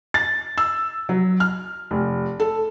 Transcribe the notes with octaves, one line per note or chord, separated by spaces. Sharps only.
A6
E6
F#3
F6
F1
A4